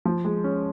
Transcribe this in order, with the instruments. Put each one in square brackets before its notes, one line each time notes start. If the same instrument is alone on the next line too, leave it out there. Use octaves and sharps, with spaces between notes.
[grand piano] F3
G#3
C#4